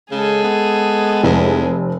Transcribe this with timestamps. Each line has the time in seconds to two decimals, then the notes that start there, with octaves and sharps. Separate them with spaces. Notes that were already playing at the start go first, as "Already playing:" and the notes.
0.11 C#3 G#3 G#4 A4
0.44 B3
1.23 F1 E2